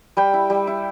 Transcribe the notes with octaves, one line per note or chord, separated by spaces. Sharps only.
G3 G5 B5
E4
G3
E4